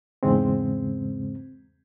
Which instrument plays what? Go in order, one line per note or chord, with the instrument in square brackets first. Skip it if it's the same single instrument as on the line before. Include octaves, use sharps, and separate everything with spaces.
[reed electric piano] E2 G#2 C#3 G#3 C4